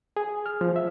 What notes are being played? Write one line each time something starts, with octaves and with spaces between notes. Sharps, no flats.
G#4
F6
F3
E5